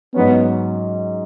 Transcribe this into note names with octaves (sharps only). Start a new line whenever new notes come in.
G#2 F#3 B3 C#4